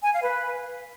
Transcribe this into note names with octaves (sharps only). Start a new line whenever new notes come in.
G#5
F5
B4